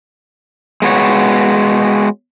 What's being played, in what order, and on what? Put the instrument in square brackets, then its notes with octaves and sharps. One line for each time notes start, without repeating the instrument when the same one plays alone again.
[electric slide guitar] G#3 B3 F#4 C#5